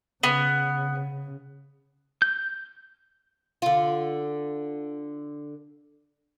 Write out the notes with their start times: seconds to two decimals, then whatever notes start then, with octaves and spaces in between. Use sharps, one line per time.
0.23 C#3 B3
2.22 G6
3.62 D3 F4